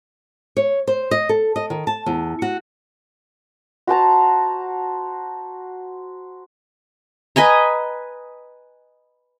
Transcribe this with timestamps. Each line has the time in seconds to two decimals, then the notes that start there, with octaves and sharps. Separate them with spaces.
0.57 C#5
0.87 C5
1.11 D#5
1.29 A4
1.56 D#5
1.70 D#3
1.87 A5
2.06 E2
2.42 F#4
3.87 F#4 C5 A5 A#5
7.36 B4 D#5 G#5 A#5